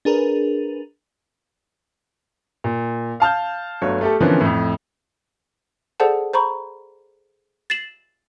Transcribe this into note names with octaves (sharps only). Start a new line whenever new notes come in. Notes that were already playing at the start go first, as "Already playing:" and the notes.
D4 G#4 A#4 B4
A#2
F5 A5 F6 G6
G1 F#3 A3 C#5
A3 G4 A4
D3 E3 F3 A#3 C4 C#4
F2 A2
G#4 A4 C5 D5 F#5 A5
C5 A#5 B5 C#6
A6 C7 E7 F#7